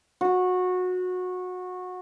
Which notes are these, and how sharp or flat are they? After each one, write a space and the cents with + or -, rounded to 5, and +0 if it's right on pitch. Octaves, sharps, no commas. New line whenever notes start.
F#4 -20